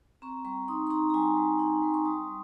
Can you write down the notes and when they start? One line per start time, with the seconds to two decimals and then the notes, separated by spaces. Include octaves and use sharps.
0.22 C4 A#5 C#6
0.45 G3 A#5 C#6
0.68 D#4 C6 D#6
0.87 C6
0.90 D#4 A#5 C#6
1.10 A#5
1.14 G3 G#5 C6
1.37 G3
1.59 D#4
1.82 G3 C6
1.94 C#6
2.05 G3 C6 D#6
2.28 G3